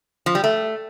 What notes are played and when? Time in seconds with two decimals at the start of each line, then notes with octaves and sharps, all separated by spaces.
0.26 F3
0.35 G3
0.44 A3